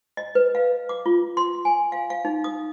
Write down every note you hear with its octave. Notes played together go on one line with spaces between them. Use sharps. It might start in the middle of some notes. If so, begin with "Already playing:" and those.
D#5
B4
F5
D6
F4
C6
G#5
F5
F5
D#4
D#6